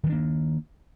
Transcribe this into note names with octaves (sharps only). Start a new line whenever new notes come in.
D#3 F3 A#3 D4